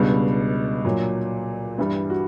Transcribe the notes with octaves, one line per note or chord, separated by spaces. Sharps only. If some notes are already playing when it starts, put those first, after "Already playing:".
Already playing: C#2 B2 G3 D4
A#2 F#3
G2 E3 G3 E4
F#4